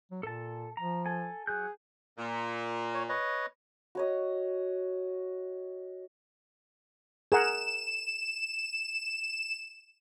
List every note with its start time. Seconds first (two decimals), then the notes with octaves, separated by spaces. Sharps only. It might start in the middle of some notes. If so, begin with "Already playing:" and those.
0.11 F#3
0.23 A#2 A4 A5
0.77 F3 A#5
1.06 A4 G#5
1.47 F#3 G#4 F#6 G6
2.18 A#2
2.94 C#5
3.09 B4 C#5 D#5
3.95 F#4 C#5 D#5
7.32 G#4 A#4 F#5 E7